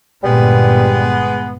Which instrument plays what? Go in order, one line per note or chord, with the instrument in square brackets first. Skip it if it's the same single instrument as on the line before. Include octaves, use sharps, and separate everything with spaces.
[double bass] G1 A#2 [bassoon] G3 [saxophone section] G#3 B3